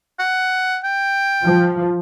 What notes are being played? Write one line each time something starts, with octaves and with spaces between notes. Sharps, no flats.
F#5
G5
F3